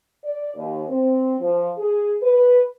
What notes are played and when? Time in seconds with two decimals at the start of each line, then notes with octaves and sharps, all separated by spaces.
0.24 D5
0.55 D#2
0.88 C4
1.40 F3
1.78 G#4
2.22 B4